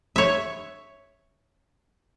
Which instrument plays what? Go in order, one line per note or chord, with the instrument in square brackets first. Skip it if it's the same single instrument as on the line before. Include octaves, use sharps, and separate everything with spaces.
[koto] C#5 E5